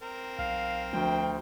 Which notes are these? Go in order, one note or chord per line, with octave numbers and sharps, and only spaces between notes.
C4 A#4
B1 F5
D2 F3 G5